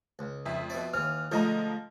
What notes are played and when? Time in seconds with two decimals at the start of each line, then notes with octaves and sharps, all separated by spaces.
0.19 C#2
0.46 F2 E5
0.70 B2 D5
0.94 D#2 E3 F6
1.31 D3 F3 G#3 A3 D#5 A#5